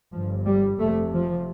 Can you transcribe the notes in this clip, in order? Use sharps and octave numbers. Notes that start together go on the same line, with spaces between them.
G1 G2 F3
G3
F1 F2 C3 A3
F3